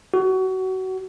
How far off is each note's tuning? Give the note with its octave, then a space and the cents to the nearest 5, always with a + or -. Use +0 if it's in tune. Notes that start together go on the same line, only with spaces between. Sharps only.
F#4 +25